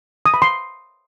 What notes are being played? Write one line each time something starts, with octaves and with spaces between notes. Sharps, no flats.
D#6
B5
C6